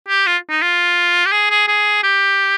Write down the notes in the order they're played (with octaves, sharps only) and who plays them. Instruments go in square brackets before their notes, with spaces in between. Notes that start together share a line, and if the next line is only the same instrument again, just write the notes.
[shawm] G4
F4
D#4
F4
G4
G#4
G#4
G#4
G4